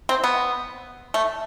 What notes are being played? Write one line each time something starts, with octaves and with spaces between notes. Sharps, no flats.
C4
B3
A3